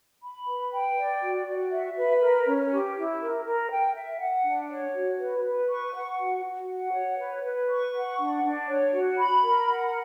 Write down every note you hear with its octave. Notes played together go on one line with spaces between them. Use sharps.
B5
B4
G5
D5
F#4
F#4
E5
B4
A#4
C#4
G4
E4
A#4
A#4
G5
E5
F#5
D4
C#5
F#4
B4
B4
C#6
F#5
F#4
F#4
F#5
C#5
B4
B4
C#6
F#5
D4
D4
C#5
F#4
B5
A#4
F#5